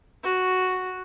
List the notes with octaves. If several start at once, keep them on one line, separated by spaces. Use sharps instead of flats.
F#4